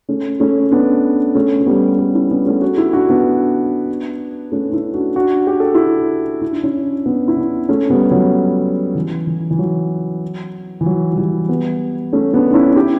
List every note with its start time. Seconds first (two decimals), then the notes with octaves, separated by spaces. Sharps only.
0.09 A3 C#4
0.40 A3 C#4
0.71 B3 D4
1.35 A3 C#4
1.60 C#4
1.66 G3 B3
1.98 A3 C#4
2.14 C#4 E4
2.31 B3 D4
2.46 A3 C#4
2.61 F#4 A4
2.77 E4 G4
2.93 D4 F#4
3.10 B3 D4
4.52 A3 C#4
4.69 D4
4.73 C#4 E4
4.94 D4 F#4
5.15 D4 F#4
5.47 G4
5.60 A4
5.74 E4 G4
6.42 E4
6.52 D4
6.63 C#4 E4
7.06 B3 D4
7.28 E4
7.37 B3 D4
7.69 A3 C#4
7.90 G3 B3
8.11 F#3
8.95 E3
9.27 E3
9.51 E3
9.59 F#3
10.81 E3
10.86 F#3
11.13 F#3
11.17 E3 G3
11.49 G3 B3
12.13 A3 C#4
12.33 B3 D4
12.50 D4
12.54 C#4 E4
12.76 E4 G4